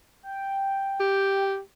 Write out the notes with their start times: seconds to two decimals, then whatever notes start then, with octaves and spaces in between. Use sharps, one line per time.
0.23 G5
1.00 G4